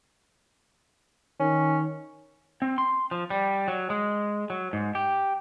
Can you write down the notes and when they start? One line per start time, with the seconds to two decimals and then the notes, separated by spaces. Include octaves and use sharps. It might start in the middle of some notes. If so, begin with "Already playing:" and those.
1.39 D#3 C#4
2.62 C4
2.78 C6
3.11 F3
3.30 G3
3.68 F#3
3.90 G#3
4.50 F#3
4.73 G#2
4.95 G4